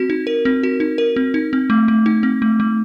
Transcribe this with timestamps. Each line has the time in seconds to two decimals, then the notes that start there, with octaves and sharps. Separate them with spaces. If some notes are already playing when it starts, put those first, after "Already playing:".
Already playing: C4 F#4
0.10 D#4
0.27 A#4
0.45 C4
0.63 F#4
0.80 D#4
0.98 A#4
1.16 C4
1.34 D#4
1.53 C4
1.70 A3
1.88 A3
2.06 D#4
2.23 C4
2.42 A3
2.60 A3